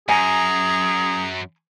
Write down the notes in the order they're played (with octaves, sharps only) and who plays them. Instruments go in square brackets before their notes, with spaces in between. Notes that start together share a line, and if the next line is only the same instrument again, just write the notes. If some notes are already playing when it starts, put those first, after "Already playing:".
[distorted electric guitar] F#2 [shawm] G#4 [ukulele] G#5 [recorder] A#5